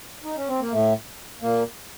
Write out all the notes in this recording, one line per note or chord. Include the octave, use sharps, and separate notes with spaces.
D#4
C#4
C4
A#3
A2 A3
A#2 A#3